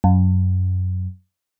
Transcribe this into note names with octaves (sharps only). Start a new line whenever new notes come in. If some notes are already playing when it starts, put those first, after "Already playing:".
F#2